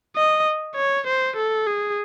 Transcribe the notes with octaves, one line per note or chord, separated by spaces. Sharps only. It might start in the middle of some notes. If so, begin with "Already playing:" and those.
D#5
C#5
C5
A4
G#4